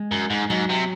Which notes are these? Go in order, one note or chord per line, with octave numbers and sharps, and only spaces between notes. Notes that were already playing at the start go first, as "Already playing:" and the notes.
Already playing: G#3
F#2
G#2
G#2 F#3
C3